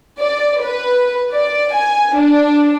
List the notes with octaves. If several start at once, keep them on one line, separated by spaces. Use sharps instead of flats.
D5
B4
D5
G#5
D4